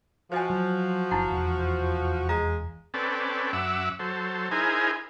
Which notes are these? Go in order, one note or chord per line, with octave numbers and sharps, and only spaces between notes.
F3 F#4 C5 D#5 G#5
F#3
F#1 D#4 E4 F#5
F1 E2
G#3 D#5 F5 A#5
C4 C#4 A4 B4 D5
F#2 E5 F#5 D6 E6
F#3 A4 C5
D#4 E4 G#4 A#4 C5 G#5